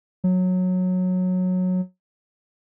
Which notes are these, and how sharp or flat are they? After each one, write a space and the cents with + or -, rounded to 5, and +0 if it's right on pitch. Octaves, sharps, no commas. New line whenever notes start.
F#3 -15